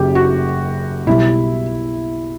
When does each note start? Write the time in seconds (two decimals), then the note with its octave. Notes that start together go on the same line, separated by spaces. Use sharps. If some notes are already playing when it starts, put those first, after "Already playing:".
Already playing: F#1 F#2 G4
0.15 F#4
1.06 B1 B2 G3 E4